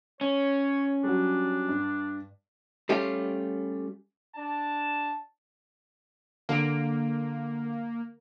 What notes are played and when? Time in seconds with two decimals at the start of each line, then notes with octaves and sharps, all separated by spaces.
0.21 C#4 C#5
1.04 F#3 G3 D4
1.69 G2
2.89 G3 A3 C#4 F4 G4
4.36 D4 A5
6.49 D3 A#3 D7